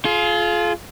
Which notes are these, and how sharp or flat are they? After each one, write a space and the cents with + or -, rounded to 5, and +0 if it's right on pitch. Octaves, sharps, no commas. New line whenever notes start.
F4 +0 G#4 +40